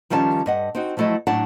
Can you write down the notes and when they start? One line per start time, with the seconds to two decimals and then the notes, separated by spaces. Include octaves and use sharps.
0.10 D#3 F3 G3 C#4 G5 A5
0.46 G2 D#5 F#5
0.75 C4 D#4 F#4
0.97 F3 F#3 A3 E4 D#5
1.27 A2 F#3 D4 F#5 A5